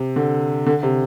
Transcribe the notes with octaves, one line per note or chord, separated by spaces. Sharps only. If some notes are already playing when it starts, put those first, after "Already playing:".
Already playing: C3
D3
D3
C3